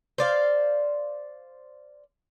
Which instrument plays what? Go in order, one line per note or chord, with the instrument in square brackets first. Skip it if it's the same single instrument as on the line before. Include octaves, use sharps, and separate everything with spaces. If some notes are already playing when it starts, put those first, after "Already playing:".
[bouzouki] C5 D5 F5